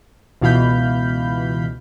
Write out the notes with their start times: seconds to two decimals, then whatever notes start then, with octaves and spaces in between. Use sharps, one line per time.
0.41 C#2 B2 E3 F5 B5 G6